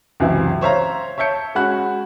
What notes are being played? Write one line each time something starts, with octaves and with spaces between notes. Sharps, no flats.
C#2 F#2 C3 E3 E4
C5 C#5 E5 F5 A#5
C#5 E5 A5 G6 C#7
G#3 C#4 F#4 B5 F#6